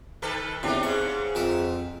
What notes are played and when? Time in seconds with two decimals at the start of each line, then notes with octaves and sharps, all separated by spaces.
0.22 D#3 A4 B4
0.63 E2 A2 C3 D4 D#4
0.83 G#2 C#3 C#6
1.35 F2 A#4 E5